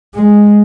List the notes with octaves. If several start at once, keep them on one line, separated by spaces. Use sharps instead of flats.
G#3